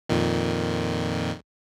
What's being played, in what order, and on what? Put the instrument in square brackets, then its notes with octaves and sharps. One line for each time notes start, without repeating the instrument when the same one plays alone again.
[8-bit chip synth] F2 A#2 D#3